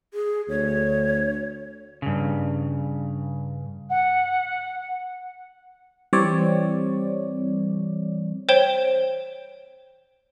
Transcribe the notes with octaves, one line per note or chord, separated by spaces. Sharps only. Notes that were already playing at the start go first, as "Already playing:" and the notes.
G#4
D2 C#5
G2 C#3
F#5
E3 G3 C4 C#5 D5
C5 C#5 G5 E7 G7